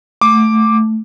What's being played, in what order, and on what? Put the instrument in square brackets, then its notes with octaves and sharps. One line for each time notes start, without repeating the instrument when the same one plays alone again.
[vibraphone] A3 [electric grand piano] D6